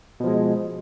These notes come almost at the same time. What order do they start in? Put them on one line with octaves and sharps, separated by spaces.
B2 F3 G#3